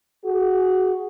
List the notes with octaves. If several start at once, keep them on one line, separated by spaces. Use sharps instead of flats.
F#4 G#4